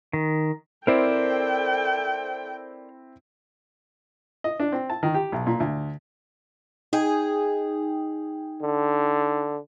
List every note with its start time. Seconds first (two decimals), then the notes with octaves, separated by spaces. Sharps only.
0.13 D#3
0.87 C4 E4 A4 A#4 C5 D5 G5
4.44 D#5
4.60 D4
4.72 C4
4.90 A5
5.03 D#3
5.14 G4
5.32 B1
5.47 A#2
5.60 D2
6.93 D#4 G#4 G5
8.62 D3